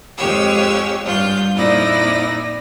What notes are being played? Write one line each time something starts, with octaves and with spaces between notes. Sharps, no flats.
F2 G#3 G4 C#5 E6
G2 F4 G6
F2 A#2 D#4 E4 D5 A#6